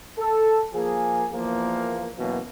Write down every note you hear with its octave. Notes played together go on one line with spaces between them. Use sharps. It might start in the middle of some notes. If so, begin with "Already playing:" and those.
A4
F3 A#3 G#4
E2 F3 A#3
F#2 B2 E3 F#3 A#3